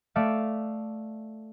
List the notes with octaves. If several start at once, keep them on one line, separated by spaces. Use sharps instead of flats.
A3 D5 E5 F5